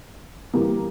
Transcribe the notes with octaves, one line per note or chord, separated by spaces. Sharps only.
E3 G3 A#3